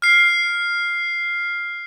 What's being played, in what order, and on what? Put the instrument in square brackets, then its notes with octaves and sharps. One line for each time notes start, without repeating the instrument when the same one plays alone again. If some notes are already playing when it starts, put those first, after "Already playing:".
[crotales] F6 C7